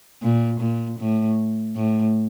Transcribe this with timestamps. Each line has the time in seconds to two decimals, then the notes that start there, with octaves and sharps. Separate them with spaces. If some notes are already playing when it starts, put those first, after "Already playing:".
0.22 A#2
0.61 A#2
0.99 A2
1.76 A2